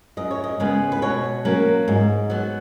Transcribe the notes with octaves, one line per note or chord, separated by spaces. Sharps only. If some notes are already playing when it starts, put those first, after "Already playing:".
F#2 D#5
C#5
D#5
C#3 G#3 B3
B4
B2 C#5
F#3 A#3 C#4
G#2
F#3 B3